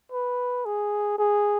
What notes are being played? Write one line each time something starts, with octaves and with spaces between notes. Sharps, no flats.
B4
G#4
G#4